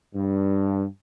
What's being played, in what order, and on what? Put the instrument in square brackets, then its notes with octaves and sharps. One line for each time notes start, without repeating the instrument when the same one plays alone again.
[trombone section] G2